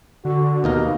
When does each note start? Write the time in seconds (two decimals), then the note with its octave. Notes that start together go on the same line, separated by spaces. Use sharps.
0.25 D3 F#4
0.64 D#2 B2 A#3 D#4 A#4